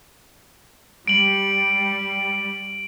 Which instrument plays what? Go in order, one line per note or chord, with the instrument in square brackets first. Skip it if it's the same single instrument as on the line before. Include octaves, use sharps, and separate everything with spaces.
[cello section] G3 [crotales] D7 F#7